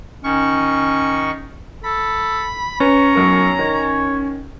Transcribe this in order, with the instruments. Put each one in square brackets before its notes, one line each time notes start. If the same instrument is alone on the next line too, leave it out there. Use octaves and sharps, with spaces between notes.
[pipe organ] D#3 C#6 [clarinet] C#4
[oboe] A4 [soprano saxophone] B5
[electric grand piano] C#4 [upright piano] B4 [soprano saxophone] A#5 [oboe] C#6
[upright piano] B1 F#2 A#4
[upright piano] D#3 [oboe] C#5